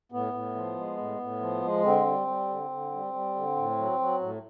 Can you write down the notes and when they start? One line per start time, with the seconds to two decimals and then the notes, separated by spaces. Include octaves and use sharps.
0.12 A2 B3
0.33 A2
0.55 F3
0.77 G#3
0.97 A2
1.19 A2
1.40 F3
1.62 G#3
1.83 D3 C4
2.05 G3
2.27 G3
2.49 D3
2.70 D3
2.92 G3
3.13 G3
3.35 D3
3.56 A2
3.77 F#3
3.99 F#3
4.21 A2